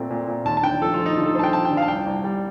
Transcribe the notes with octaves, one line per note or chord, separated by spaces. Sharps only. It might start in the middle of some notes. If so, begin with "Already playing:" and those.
Already playing: A#2 A3 C4
A#2
A#2
D#2 A5
A5
D3 G5
F3 A4
F3 F4
D#4
D3 F4
A4
F3 C5 A5
G5
F3 A5
G5
D3
F5
A5
C2 G5
C2
G3